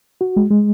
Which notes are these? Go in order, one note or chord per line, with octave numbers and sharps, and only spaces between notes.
F#4
G#3
G#3